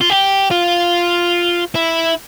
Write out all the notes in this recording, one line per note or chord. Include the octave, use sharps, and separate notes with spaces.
F4
G4
F4
E4